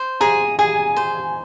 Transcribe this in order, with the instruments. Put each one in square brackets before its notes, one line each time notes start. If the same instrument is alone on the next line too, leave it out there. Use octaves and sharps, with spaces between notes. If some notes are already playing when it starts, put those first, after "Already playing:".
Already playing: [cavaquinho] C5
[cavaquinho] G#4 [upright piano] A#5
[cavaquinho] G#4 [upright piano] G#5
[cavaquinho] C5